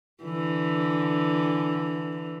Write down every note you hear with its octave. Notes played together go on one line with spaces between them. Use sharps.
D3 E3